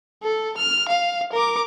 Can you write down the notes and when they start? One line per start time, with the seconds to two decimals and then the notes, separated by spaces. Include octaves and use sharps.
0.23 A4
0.57 F6
0.88 F5
1.32 A#4 D6